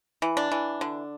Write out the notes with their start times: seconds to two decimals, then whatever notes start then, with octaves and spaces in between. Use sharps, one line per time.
0.22 E3
0.37 D4
0.52 E3
0.81 D3